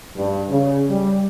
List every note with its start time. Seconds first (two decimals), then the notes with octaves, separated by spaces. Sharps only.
0.17 G2
0.50 C#3
0.91 G3